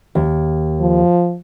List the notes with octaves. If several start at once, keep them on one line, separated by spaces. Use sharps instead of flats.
D#2
F3